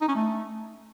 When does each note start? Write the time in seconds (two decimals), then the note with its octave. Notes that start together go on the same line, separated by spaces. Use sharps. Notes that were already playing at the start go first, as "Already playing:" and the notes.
0.01 D#4
0.08 C#4
0.15 A3